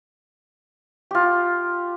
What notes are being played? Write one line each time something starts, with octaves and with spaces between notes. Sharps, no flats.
F4 G4